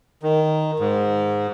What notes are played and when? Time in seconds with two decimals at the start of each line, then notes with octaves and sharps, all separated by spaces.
0.23 D#3
0.80 G#2